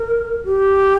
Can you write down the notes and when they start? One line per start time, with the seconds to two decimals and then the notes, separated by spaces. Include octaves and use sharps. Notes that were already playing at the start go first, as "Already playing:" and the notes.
Already playing: A#4
0.44 G4